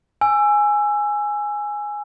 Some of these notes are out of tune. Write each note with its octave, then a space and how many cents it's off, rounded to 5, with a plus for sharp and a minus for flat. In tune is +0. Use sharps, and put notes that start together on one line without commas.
G#5 +0 E6 +20